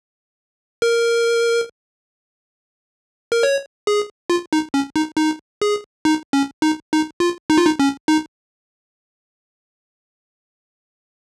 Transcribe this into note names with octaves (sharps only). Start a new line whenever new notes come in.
A#4
A#4
C#5
G#4
F4
D#4
C#4
D#4
D#4
G#4
D#4
C#4
D#4
D#4
F4
D#4
F4
D#4
C#4
D#4